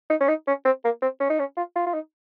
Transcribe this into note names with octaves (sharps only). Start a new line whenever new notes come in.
D#4
C#4
D#4
C#4
C4
A#3
C4
C#4
D#4
C#4
F4
F4
F4
D#4